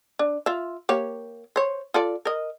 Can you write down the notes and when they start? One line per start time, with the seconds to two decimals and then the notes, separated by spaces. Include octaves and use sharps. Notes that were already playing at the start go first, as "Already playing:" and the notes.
0.19 D4
0.46 F4 E5
0.89 A#3 G4 C#5
1.56 C5 C#5
1.94 F4 A4 D5
2.25 A#4 D#5